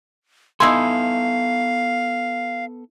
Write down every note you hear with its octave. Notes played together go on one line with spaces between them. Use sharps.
B3 D#4 E4 A4 F5 G#5 C6